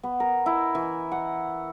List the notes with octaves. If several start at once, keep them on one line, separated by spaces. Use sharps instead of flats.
B3
A#4
E4
E3
F#5